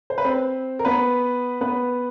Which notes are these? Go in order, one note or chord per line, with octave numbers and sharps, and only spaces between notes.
C5
B4
C4 C5
A#4
B3 B4
B3 B4